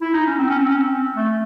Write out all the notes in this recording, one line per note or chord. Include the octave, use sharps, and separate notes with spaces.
E4
D#4
C#4
C4
C#4
C4
C#4
C4
A3